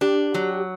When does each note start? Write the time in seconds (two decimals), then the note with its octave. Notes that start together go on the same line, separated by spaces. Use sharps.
0.01 D4 G4
0.35 F#3